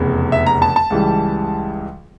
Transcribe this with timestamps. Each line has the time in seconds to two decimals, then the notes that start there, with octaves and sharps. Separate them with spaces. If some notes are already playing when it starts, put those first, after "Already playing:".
Already playing: F1 E2 C#3
0.32 E5
0.46 A#5
0.62 A5
0.76 A5
0.90 C#2 C#3 E3 G3